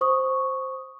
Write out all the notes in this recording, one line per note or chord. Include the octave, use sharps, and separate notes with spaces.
C5 C#6 D#6